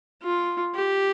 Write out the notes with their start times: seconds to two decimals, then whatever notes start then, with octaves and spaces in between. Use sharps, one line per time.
0.23 F4
0.75 G4